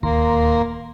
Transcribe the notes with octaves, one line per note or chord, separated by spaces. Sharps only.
D1 D#2 D#3 A#3 A#5 C6